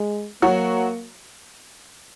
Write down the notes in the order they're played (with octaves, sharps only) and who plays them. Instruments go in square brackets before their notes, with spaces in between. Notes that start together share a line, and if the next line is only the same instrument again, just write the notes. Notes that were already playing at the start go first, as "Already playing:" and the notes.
Already playing: [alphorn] G#3
[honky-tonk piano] F#3 F#4 [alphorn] A#3